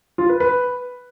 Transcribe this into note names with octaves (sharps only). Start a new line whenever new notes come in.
F4
B4
B4